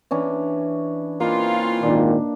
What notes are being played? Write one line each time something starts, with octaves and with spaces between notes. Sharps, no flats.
E3 C#4 D4
E3 A#3 C4 D#4 F4
G#1 A#2 D#3 D4